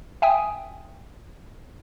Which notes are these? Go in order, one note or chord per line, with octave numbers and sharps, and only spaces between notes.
E5 G5 G#5 D#6